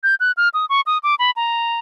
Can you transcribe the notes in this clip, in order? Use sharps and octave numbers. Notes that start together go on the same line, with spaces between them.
G6
F#6
F6
D#6
C#6
D#6
D6
B5
A#5